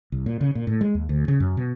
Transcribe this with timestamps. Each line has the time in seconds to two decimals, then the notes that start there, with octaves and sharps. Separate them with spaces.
0.12 C2
0.26 A#2
0.41 C#3
0.55 A#2
0.67 A2
0.81 G#3
0.95 D#2
1.09 D2
1.28 C#3
1.40 F#2
1.57 B2